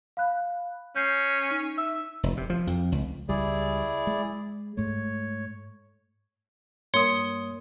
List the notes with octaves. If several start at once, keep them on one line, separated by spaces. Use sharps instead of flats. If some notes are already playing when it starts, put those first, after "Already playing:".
F5 B5 F#6
C#4 G6 C7
D#4
E5
F1
C3
F3
F2
C#2
C#2 G3 E4 G#4 D5
G#3
G#2 A3 C#5
G2 A#3 C#5 C6 D#6 C#7